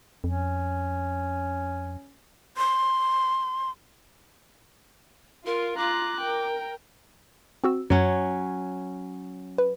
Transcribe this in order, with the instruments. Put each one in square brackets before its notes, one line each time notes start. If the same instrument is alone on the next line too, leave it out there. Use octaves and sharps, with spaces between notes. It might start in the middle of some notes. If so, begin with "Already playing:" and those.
[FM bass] F2 [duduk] C#4
[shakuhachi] C6
[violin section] F4 [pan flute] A#4
[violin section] F4 [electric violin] A#5 F#6 [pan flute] D6
[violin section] A#4 [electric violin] G5
[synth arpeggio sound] C4 F#4 E6
[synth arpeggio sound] F#2 [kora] F#3 C#4
[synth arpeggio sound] B4